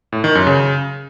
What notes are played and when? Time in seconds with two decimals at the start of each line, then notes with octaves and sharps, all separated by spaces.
0.12 A2
0.24 D#3
0.35 F#2
0.47 C#3